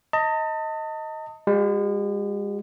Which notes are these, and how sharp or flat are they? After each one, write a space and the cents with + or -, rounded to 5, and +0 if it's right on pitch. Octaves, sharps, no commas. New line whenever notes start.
D#5 +15 A5 +40
G#3 -40 F#4 +0